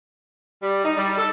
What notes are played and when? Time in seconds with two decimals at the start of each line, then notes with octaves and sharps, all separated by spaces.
0.63 G3
0.84 D#4
0.97 G3
1.18 A4